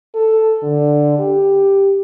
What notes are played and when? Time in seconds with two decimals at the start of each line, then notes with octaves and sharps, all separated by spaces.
0.15 A4
0.63 D3
1.19 G4